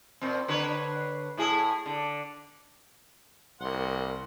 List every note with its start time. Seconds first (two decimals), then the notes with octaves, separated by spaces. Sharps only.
0.21 A#2 C4
0.48 D3 B4 C#5
1.37 A2 E4 G#4
1.86 D3
3.61 C2 A#3 F#5 C6